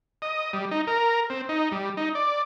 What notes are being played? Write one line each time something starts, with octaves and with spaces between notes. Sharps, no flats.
D#5
G3
D#4
A#4
C4
D#4
G3
D#4
D5